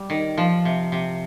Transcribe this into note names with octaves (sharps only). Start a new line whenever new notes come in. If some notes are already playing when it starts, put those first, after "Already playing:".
Already playing: G3
D#3
F3
C3
C3